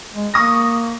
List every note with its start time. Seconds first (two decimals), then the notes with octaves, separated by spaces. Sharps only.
0.15 G#3
0.34 A#3 C#6 D#6 A#6